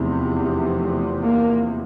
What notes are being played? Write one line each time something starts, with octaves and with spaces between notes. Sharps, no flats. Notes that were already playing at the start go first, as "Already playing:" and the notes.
Already playing: F1 E2 C3
A#3